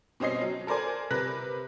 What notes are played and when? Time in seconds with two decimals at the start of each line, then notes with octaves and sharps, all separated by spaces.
0.20 B2 C4 C#4 D#5 C7
0.41 F#3
0.67 A4 A#4 C5 D5 G#5
1.11 C3 A#4 B4 F#6 A#6